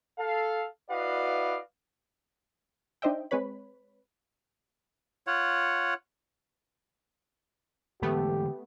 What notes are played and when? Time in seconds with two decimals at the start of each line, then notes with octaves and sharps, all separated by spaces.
0.19 A4 F5
0.90 E4 F#4 B4 D5 D#5 F5
3.02 D4 D#4 C5 D#5 E5 G5
3.31 G#3 C4 B4 C#5 B5
5.27 F4 C#5 F#5
8.02 D3 E3 G#3 A3 B3 G4